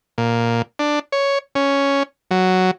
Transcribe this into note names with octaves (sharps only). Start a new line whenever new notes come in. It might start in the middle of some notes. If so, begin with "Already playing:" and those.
A#2
D4
C#5
C#4
F#3